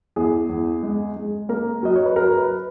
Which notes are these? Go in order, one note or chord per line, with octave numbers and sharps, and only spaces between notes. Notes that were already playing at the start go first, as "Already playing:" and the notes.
E2 G#4
E2
G#3
G#3
A#3 A#4
F#3 D#5
C#5
B4
F#3 A#4
B4